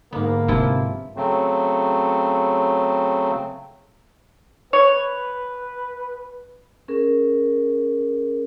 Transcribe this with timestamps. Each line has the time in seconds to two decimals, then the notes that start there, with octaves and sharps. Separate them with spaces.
0.12 G#2 D3 A#3 B3
0.48 C3 F3 E4 F4
1.16 C#3 F#3 A3 C4
4.73 B4 C#5
6.88 C#4 G#4 A#4